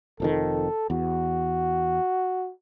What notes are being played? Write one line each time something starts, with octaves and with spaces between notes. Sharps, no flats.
F1 F2 D#3 A4
E2 F#4